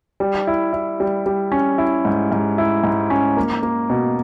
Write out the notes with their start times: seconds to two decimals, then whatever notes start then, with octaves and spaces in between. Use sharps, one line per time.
0.20 G3
0.47 E4
0.73 E4
1.00 G3
1.26 G3
1.52 C#4
1.78 E4
2.05 G#2
2.32 G#2
2.58 E4
2.84 G#2
3.10 C#4
3.37 A#3
3.63 A#3
3.90 B2